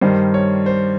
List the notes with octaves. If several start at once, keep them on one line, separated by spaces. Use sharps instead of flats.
G2 D#3 G3 C5
C#5
C5